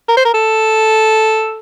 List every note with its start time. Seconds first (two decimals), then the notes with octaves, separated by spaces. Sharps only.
0.08 A#4
0.17 C5
0.25 A#4
0.34 A4